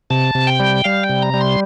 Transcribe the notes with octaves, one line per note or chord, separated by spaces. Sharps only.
C3 A5
C3
G5
G3
G3 F5
G5
C3
A#5
G3
C6